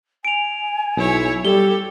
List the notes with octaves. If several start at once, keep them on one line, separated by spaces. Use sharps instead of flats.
G#5 D7 F7
B1 E4 C#5
G3 G4 A4 G7